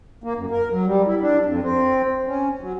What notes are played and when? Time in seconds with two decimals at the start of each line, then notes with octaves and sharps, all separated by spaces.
0.24 A#3
0.37 F#2
0.51 A#4
0.71 F#3
0.86 G3
1.06 E4
1.20 D4
1.45 F2
1.62 C4
2.27 C#4
2.61 F#3